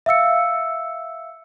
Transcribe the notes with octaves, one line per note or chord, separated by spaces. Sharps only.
E5 F5 E6 C#7